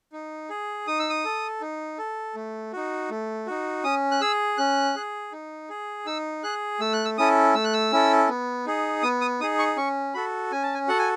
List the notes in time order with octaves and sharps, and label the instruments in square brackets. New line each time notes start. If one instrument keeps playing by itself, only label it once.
[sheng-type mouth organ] D#4
G#4
D#4 D#6
E6
D#6
A4
D#4
A4
A3
D#4 F#4
A3
D#4 F#4
C#4 D#6
F#6
G#4 E6
C#4 F#6
G#4
D#4
G#4
D#4 E6
G#4 F#6
A3 E6
F#6
E6
C#4 E4 A4 D#6
A3 E6
F#6
E6
C#4 E4 A4
B3
D#4 G#4
B3 D#6
D#6
D#4 G#4 D#6
C#6
C#4 C#6
F#4 A4 B5
C#4 G#5
A5
G#5
F#4 A4 F#5
G#5